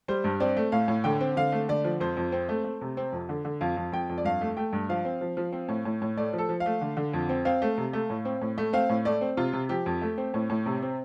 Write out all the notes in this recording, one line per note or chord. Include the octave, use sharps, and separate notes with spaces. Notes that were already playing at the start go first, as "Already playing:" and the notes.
G3 C5
G2
C4 D5
A3
A2 F5
A2
D3 G5
C4
D3 F5
A3
D3 D5
F3
F2 C5
F2
C4
A3
A3
C3
C4
F2
D3
D3
F2 F5
F2
F2 G5
F2
D5
G2 F5
A3
A3 G5
G2
F3 F5
C4
F3
F3
C4
A2
A2
A2
A3 D5
F3
A4
F3
F5
A3
D3
D3
F2
C4
C4 F5
A3
C3
A3
A2
C4
A2
A3
C4 F5
A2
A3 D5
C4
C3 F4
C3
F3 G4
F2
A3
C4
A2
A2
C3
C4